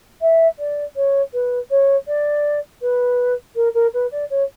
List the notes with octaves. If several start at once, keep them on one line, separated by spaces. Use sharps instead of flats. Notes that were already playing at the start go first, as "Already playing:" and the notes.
E5
D5
C#5
B4
C#5
D5
B4
A#4
A#4
B4
D5
C#5